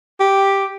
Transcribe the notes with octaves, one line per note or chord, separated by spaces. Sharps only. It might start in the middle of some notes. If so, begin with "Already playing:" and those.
G4